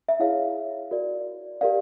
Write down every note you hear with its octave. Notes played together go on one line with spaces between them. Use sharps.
E5
E4 G#4 C#5 F5
F#4 A#4 D5
G4 A#4 D5 F5